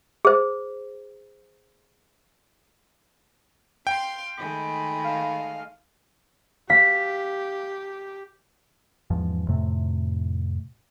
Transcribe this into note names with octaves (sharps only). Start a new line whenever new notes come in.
G#4 C5
F5 G5 C6
D#3 G#3 A3 B5
F5
G4 F5 B6
E2 G#2 F3
F2 A2 C3 A3